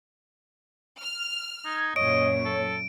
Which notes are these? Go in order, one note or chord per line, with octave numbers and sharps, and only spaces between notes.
F6
D#4 G#6
F#2 A#2 C#5 D#5 D7
A4